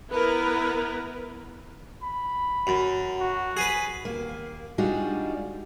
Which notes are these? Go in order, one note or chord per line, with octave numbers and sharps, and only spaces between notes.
B3 E4 A#4 B4
B5
F#2
F#4
G#4 B4
D#2 A#3
G3 G#3 D4 D#4 F4 F#4